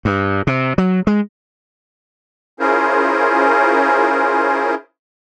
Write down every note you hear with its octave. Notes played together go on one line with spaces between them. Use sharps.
G2
C3
F#3
G#3
C#4 E4 F4 G#4 A#4 C5